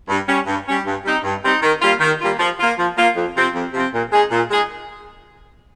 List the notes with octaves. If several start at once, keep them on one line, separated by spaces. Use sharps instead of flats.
G2
G3 C#4
G2
G3 C#4
G2
G3 C4 D#4
G2
G3 C4 D#4
D#3
G3 A#3 F4
D#3
G3 A#3 F4
F3
A#3 F4
F3
A#3 F4
F2
C3 F3 C4
F2
C3 F3 C4
A#2
G#3 D#4 G#4
A#2
G#3 D#4 G#4